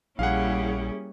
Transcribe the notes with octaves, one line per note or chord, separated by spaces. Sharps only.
A#1 G3 A#3 C#4 E4 G#4 F5 F#5